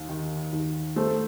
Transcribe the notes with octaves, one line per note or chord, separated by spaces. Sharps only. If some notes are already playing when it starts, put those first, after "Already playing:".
Already playing: D#2
D#3
D#2
A3 A4 C5